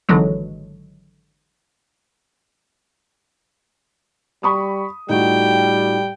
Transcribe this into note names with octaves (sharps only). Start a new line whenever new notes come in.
G#1 D3 E3 F#3 G#3
G3 B5 C#6 D#6
A2 G3 D#4 F4 F#4 G5